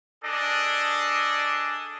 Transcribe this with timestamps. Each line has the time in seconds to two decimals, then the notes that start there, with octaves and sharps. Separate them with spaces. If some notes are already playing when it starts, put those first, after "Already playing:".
0.23 D4 G#4 A4 D5 D#5